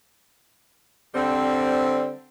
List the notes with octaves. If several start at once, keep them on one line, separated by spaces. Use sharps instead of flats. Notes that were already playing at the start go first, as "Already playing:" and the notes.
D3 G3 C4